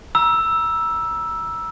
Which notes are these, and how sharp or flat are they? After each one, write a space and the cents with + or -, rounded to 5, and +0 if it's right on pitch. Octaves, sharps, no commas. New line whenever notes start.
A#5 +35 E6 +0